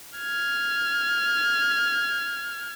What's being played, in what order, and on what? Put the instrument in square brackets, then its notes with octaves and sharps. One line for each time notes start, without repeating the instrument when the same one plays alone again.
[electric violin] F6 G#6